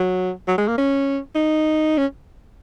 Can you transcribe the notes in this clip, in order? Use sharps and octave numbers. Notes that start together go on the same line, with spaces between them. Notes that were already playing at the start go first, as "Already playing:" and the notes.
Already playing: F#3
F#3
G#3
A#3
C#4
D#4
C#4